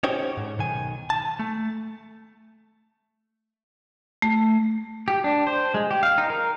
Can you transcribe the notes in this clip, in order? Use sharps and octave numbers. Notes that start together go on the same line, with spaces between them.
C#4 D#4 F#4 G4 C5 C#5
G#2
B1 D#3 G#5
A5
A3
A3
G4
D4
C5
G#3
G4
F5
D#4
A#4